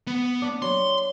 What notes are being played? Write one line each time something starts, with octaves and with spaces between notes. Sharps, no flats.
B3
D4
F#3 C6